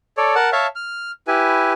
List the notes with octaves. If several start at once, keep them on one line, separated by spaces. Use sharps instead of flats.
A4 C#5 D5
A#4 F#5 A5
C#5 E5 F5 A5
F6
E4 G4 B4 G#5